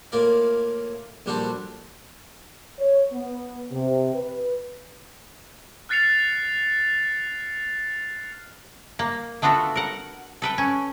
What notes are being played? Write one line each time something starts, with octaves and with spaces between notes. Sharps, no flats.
A2 A#3 F4 A#4 D5
A#1 G3 D4 F#4 A4 C5
C#5
B3
C3
B4
F6 F#6 A6 C7 C#7 F7
A#3
A3 B3 D4 F4 F#4 A4
A#4 F#5
A4 B4 G5
C#4